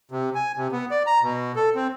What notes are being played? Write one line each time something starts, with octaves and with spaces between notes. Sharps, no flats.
C3
G#5
C3
B3
D5
A#5
B2
A4
C4